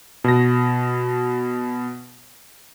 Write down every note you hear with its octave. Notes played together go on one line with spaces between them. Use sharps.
B2 A#6